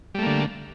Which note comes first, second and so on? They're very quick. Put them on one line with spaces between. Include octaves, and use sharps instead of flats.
G3 A3 A#3 D3